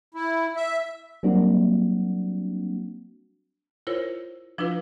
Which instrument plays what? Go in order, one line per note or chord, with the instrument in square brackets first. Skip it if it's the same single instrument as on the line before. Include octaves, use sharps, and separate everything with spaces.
[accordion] E4
E5
[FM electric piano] F#3 G3 A#3 C4 D4 F#4
[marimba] E4 F4 A#4 C5 C#5
F3 D4 E4 F4 B4